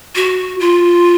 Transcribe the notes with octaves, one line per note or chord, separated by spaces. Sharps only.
F#4
F4